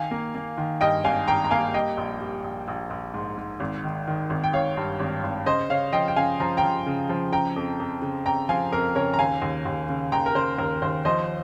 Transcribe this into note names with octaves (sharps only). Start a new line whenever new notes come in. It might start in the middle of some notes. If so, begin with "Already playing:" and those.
Already playing: D#3 F5 G#5
A#3
A#3
D#3
G2 D#5 G5
G#1 F5 G#5
G#1 G5 A#5
A#5
A#3 F5 G#5
G3 D#5 G5
A#1
G3
A#1
A#1
A#1
G#2
G#2
G#1
D#3
D#3
G#1
G5
G#1 C#5 F5
G2
G#1
G#1
C#3 C5 D#5
C#3 C#5 F5
F3 D#5 G5
G5
C#3 F5 G#5
F3 A#5
G5 A#5
F3
C#3
F3
C#3 G5 A#5
F2
F2
C#3
F2 G5 A#5
F3 F5 G#5
F2 A#4
C#3 A#4 C#5
A#5
D#2 F5 G#5
D#2
D#2
C#3
D#2 G5 A#5
A#4
C#3 C5
D#2 A#4
D#2 C5
F3 C5 D#5